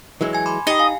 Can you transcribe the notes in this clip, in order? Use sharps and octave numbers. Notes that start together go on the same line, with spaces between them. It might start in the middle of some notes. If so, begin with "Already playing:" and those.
E3 F#3 G#3
G#5 G#6
B5 C6 D6
D#4 G4 D#5 G5
F5 G#5